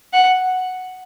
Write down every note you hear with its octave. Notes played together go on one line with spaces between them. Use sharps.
F#5